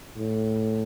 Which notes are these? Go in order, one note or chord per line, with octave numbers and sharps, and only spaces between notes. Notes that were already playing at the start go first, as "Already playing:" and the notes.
A2